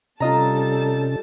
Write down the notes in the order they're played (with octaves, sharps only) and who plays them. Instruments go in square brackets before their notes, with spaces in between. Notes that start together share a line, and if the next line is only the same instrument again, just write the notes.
[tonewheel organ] C3 C#4 [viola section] G3 A4 A5 [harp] F4 D#5 A#5